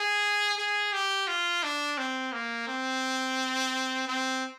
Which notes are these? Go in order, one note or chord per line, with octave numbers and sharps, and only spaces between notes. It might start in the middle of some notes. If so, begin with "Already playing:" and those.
Already playing: G#4
G#4
G4
F4
D4
C4
A#3
C4
C4